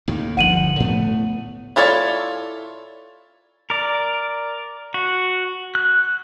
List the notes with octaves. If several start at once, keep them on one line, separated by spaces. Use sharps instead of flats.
D#2 A2 D#3
G1 D3 F3 F#5 D#7 F#7
A2 A3 B3
E4 F4 A4 C#5 D5
A#4 D5
F#4
F#6